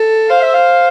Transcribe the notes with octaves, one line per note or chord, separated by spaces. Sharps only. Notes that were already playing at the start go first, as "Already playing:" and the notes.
Already playing: A4
C5 F5
E5
F5